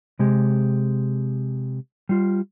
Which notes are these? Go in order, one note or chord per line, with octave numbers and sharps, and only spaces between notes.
C3 G#3 G4
G3 F4